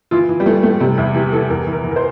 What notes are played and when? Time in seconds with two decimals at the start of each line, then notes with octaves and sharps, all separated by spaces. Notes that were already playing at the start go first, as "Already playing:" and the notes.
0.11 E3 F4
0.29 E3
0.40 G3
0.46 E3 A3
0.63 A2 A3
0.80 C3 G3
0.98 E2 E4
1.15 E3 G4
1.32 E3 A4
1.50 E2 A#4
1.67 E3
1.73 A#4
1.84 E3
1.91 A#4
1.96 C5